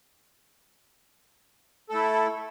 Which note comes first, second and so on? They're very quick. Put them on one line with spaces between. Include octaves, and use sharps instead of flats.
A4 A3 E4